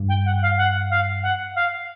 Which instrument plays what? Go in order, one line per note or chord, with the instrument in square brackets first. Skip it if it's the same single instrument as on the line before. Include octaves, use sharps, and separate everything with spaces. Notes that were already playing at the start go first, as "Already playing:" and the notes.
Already playing: [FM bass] G2
[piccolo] G5
F#5
F5
F#5
F5
F#5
F5